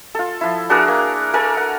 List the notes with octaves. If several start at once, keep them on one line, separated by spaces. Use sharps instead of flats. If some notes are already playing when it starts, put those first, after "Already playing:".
F4 A4
F3 E4
D4 F#4 G#4 A#4
A#3
A4 A#4 G#5
F#5